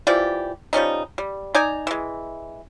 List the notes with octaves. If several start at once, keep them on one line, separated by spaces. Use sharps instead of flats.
E3 F3 G4 D5
F3 G3 C#4 D#4
G3
D#4 D5 G#5 A#5
E3 G#3